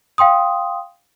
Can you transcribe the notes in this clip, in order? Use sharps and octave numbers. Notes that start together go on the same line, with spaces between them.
F5 G5 C6 D#6